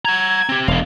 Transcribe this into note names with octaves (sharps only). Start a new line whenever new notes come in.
F#5 A#5 G#6
C4 G4
E1 B3 F5